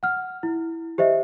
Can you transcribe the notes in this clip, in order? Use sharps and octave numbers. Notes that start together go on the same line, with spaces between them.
F#5 F6
E4
G4 C5 D#5 E5